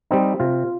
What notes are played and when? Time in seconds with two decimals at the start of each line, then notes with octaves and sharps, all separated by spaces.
0.11 G3 C4 D#4
0.40 C3 F4